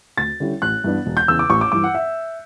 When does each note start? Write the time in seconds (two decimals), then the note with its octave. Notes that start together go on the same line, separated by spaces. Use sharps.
0.17 D2 A6
0.40 D3 G3 C#4 E4
0.62 A1 F#6
0.84 G2 E3 B3 D4
1.06 E1
1.17 G6
1.28 E2 C#3 E6
1.39 D6
1.50 A1 C#6
1.61 D6
1.72 G2 E3 D6
1.84 F#5
1.95 E5